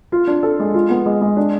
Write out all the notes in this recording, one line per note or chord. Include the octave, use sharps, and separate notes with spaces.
F4
D4
A4
G#3
F4
B3
G#3
G#3
D4